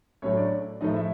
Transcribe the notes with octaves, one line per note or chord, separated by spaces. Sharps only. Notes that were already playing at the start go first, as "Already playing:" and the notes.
A2 F#3 A3 C#4 C#5
D4 D5
A2 F3 A3 D#4 D#5
E4 E5